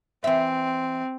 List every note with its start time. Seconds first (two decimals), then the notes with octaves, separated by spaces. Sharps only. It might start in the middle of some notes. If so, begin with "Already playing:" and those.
0.24 E3 C4 E5